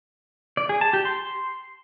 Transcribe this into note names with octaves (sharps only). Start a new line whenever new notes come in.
D5
G#4
A5
G4
C6